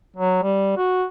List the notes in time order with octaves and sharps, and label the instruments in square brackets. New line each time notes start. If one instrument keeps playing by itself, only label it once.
[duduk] F#3
G3
F#4